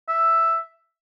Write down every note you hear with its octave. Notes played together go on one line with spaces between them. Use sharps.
E5